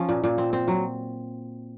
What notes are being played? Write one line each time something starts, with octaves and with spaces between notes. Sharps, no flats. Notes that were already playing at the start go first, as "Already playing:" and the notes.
Already playing: F3 C#4
A#2
A#2
C4
C4
F#3